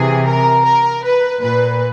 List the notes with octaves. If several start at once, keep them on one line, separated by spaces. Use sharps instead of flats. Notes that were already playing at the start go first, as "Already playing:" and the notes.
Already playing: C3 E3 G#4
A#4
A#4
B4
A#2 B4